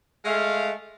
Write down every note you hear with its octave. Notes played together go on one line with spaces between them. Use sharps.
G#3 A3 F5